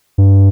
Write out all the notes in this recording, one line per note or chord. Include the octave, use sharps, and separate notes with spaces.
G2